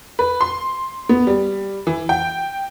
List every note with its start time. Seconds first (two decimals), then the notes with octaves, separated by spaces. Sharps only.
0.19 B4
0.41 C6
1.09 B3
1.27 G3
1.87 E3
2.09 G5